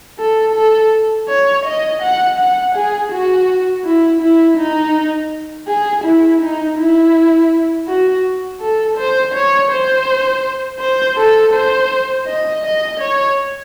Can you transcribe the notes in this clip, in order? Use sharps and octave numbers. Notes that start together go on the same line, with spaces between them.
A4
A4
C#5
D#5
F#5
F#5
G#4
F#4
E4
E4
D#4
G#4
E4
D#4
E4
F#4
A4
C5
C#5
C5
C5
A4
C5
D#5
D#5
C#5